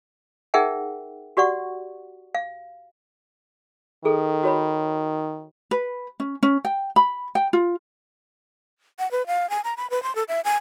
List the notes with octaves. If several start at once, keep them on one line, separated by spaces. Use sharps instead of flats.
D#4 G#4 A#4 E5 F#5 G5
F#4 G4 D5 F#5 C#6
F5
D#3 G#4 A4
F#4 C#5 B5
B4
C#4
C#4
G5
B5
G5
F4
F#5
B4
F5
G#5
A#5
B5
B4
C6
A4
E5
G#5